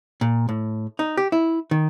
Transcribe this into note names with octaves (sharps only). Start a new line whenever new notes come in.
A#2
A2
D#4
G4
E4
D#3